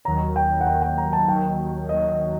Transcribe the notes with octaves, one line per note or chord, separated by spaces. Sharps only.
D#2 D#3 F#3 A#5
G5
F#5
D#2 D#3 F#3 G5
G5
A#5
A5
D#2 D#3 F#3 G5
D#2 D#3 F#3 D#5